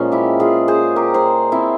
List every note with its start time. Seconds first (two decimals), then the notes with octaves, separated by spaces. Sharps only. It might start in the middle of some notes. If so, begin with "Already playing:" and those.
Already playing: A#2 F3 G#3 C#4
0.12 E4 G4
0.40 F4 G#4
0.68 G#4 C5
0.96 G4 A#4
1.14 G#4 C5
1.52 C4 E4